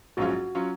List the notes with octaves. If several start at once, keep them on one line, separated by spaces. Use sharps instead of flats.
A#1 G#2 F#3 C#4 F4 F#4
F#3 C#4 F4